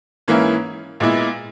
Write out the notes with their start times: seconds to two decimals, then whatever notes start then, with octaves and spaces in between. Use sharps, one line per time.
0.28 G#2 E3 A#3 C#4 E4
1.00 A#2 G#3 B3 E4